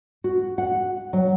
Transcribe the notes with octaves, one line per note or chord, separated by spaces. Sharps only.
F#4
F#5
F#3